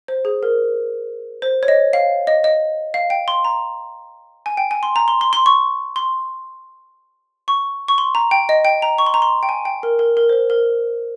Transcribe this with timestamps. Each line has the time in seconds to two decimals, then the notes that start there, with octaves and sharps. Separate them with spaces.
0.08 C5
0.25 G#4
0.43 A#4
1.42 C5
1.63 C#5
1.68 D#5
1.93 F5
2.27 D#5
2.44 D#5
2.94 F5
3.10 G5
3.28 C6
3.45 A#5
4.46 G#5
4.57 G5
4.71 G#5
4.83 C6
4.96 A#5
5.08 C6
5.21 C6
5.33 C6
5.46 C#6
5.96 C6
7.48 C#6
7.88 C#6
7.98 C6
8.15 A#5
8.31 G5
8.49 D#5
8.65 G5
8.82 A#5
8.98 C#6
9.06 C6
9.14 A#5
9.22 C6
9.43 G5
9.49 G#5
9.65 G5
9.83 A#4
9.99 A#4
10.17 A#4
10.29 C5
10.33 A#4
10.50 A#4